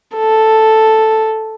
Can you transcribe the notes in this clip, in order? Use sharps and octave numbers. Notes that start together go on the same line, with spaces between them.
A4